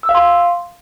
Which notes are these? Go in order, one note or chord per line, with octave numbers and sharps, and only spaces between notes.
E6
F5
C6